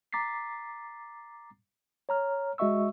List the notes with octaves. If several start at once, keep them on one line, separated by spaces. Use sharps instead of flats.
A#5 D6 A6 B6 C7
C#5 A#5 F6
G#3 F#4 D#5 E5 C#6 E6